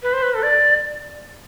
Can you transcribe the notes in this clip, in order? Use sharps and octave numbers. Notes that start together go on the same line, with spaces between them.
B4
C5
B4
A4
D5